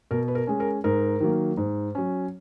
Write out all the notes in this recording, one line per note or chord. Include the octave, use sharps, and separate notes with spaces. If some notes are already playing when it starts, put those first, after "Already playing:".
B2 A#4
B4
A#4
G#3 C#4
A#4
G#2 A#4
D#3 F#3 A#3
G#2
F#3 C#4